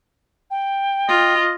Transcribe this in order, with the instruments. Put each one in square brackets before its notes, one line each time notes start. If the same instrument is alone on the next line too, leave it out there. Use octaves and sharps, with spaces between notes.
[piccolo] G5
[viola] F4 [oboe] D#5